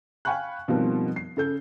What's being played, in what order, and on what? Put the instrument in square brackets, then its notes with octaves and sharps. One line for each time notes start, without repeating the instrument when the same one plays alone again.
[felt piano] F5 G5 G#5 B5 C#6 F#6
B2 D#3 F3 G3 A#3 C4
C7
C#3 A4 G6